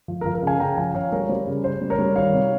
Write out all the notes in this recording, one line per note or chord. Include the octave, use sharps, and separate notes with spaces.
F3
A#4
F3
A#4
C#3 F5 G#5
C#3 G5 A#5
F3 F5 G#5
F3 C#5 F5
G3 A#4 C#5
G3 C5
C#3
C#3 C5
G3
A#4 C#5
G3
D#3 C#5 F5
C3